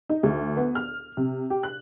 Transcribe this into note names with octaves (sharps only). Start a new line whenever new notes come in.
D#4
D2
B3
F6
C3
G4
F#6